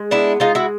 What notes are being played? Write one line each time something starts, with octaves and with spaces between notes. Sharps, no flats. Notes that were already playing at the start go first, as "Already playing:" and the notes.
Already playing: G#3
B3 D4 E4
G#3 D#4 F4
E4 F#4